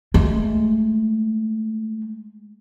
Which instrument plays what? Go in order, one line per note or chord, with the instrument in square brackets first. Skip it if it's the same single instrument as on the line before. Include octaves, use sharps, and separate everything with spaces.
[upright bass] G#3 A3